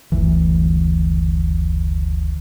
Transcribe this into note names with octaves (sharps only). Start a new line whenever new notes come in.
F#1 D2 E3